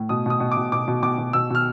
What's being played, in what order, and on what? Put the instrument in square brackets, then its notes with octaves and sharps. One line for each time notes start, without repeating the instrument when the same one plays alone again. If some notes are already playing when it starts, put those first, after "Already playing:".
Already playing: [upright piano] A2
B2 D#6
B2 D#6
B2
D6
B2
B2 D6
B2
B2 D6
B2
B2 E6
B2 F6